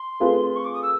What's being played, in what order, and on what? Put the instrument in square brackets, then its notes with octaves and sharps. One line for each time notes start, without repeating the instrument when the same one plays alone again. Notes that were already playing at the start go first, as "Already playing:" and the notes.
Already playing: [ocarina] C6
[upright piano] A3 C4 F4 G#4 B4
[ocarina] C6
C#6
D6
D#6
E6